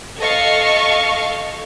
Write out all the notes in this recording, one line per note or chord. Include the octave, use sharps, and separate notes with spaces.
A4 D#5 F5 C#6